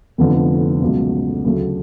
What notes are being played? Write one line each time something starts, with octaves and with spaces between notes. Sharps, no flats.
F1 F2 D3 F3 B3
C#2 B2 F#3
D2 C#3 F#3 A3